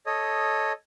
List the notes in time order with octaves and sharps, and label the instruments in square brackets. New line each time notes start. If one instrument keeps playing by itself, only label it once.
[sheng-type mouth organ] A4 C#5 D#5 D#6